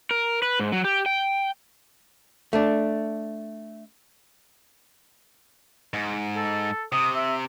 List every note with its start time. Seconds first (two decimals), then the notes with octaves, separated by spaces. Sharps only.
0.11 A#4
0.42 B4
0.59 G#2
0.72 F#3
0.84 G4
1.06 G5
2.53 A3 D4
5.94 G#2
6.36 A4
6.92 C3 D#6
7.15 E5